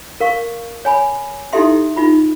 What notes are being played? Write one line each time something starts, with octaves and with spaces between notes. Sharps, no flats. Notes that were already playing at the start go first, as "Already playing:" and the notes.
A#4 F5 C#6
C#5 G#5 B5
D#4 E4 G4 A4 E5 C6
D#4 F4 B5